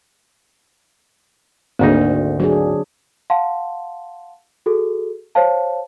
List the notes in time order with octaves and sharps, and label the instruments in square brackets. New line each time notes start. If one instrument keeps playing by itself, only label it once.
[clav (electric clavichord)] G#1 D2 D#4 [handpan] D3 C4 [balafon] A#3 D4 G#4
[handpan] F#3 D4 G#4 [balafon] F#4
[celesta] F5 F#5 A5 C6
F#4 G#4 A4
C5 C#5 F5 A5